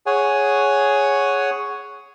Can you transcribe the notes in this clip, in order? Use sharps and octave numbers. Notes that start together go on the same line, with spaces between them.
G#4 C#5 F#5 G#5